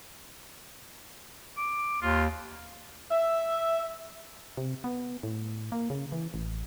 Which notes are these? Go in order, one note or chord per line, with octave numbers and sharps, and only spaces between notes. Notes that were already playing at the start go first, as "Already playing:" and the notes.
D6
D#2 F4
E5
C3
B3
A2
A#3
C#3
E3
A1